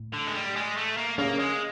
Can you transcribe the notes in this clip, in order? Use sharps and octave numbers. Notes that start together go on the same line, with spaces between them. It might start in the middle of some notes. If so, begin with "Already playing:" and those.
Already playing: A2
D3
G#3
G3
G#3
A3
A#3
C#3 A#3
G#3